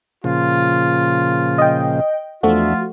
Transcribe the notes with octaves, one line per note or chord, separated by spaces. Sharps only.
A#2 C#3 F3 F4
D#5 G5
E2 F3 A3 D4 F4 F#4 E5